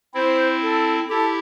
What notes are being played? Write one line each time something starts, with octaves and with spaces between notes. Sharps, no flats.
C4 E4 C5
A4
E4 G4 A4